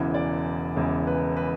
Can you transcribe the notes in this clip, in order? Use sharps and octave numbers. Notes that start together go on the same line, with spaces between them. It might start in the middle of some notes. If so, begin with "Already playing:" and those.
Already playing: E1 E2 C#3 E3
D5
E1 E2 C#3 E3
B4
B4